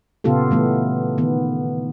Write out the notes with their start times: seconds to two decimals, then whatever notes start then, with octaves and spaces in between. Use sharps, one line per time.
0.24 A#2 C#3 B3 F4 G4 A4
0.51 E3 A3 B3
1.18 D#3 B3